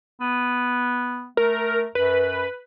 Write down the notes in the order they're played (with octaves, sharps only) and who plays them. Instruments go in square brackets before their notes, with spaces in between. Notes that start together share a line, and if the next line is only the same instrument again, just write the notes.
[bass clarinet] B3
[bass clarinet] A3 [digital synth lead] A#4
[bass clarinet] F#2 [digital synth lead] B4